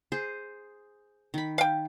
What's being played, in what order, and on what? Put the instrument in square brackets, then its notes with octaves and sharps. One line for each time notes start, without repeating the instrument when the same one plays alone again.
[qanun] G#4 C5
D#3 B5
[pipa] F5 G5